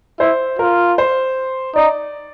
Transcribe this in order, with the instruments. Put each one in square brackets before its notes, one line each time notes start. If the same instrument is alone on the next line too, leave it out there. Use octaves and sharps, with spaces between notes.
[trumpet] E4 [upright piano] C5
[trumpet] F4 [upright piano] A#4
[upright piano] C5
[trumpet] D#4 [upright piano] D5